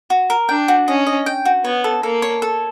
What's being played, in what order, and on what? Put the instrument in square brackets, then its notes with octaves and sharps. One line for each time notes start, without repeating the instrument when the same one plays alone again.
[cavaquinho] F#4
A#4
[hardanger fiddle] D4 [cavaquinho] G5
[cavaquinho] F#4
[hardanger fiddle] C#4 [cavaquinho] D#5
[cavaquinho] D#5
G5
F#4
[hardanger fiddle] B3 [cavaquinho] C#5
[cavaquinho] A4
[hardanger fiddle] A#3 [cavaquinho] A4
[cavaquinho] C#5
A4